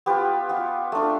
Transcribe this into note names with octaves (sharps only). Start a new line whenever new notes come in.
B3 F4 G4 B4
B3 F4
A3 D4 F4